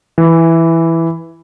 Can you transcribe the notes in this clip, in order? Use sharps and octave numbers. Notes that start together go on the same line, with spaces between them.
E3